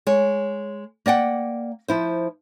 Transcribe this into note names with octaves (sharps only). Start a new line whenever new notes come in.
G#3 C#5
A#3 D5 F#5 G5
F3 E4 C5